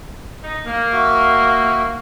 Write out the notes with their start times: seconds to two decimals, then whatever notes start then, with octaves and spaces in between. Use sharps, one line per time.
0.43 D#4
0.65 A#3
0.93 F#4 E5